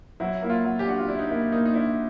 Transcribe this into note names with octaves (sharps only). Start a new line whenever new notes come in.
F#3 E4
A#3 E4
F4
F#3
G4
D4 F#4
F4
D4 E4
D#4
A#3 E4
A#3 D#4
D#4
D4 E4